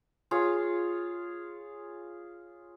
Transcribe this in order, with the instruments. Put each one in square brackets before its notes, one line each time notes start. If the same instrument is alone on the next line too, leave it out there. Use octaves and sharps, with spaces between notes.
[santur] F4 G#4 C#5